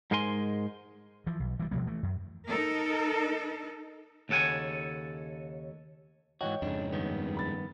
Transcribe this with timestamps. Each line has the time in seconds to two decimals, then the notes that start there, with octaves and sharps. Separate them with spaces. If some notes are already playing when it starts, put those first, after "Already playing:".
0.11 G#2 G#3 A#4 C5 G#5 C6
1.27 E3 F3
1.40 B1
1.59 E3 G3
1.71 B2 F3 G3 A#3
1.87 E3 A3
2.03 F#2
2.47 D#4 A4 A#4
4.29 D#2 C#3 A4 F#5 G#5
6.41 G#2 E3 F#4 C#5 D#5 G5
6.62 F2 G#2 C#3 D4
6.92 G2 D#3 B3
7.37 B5 A6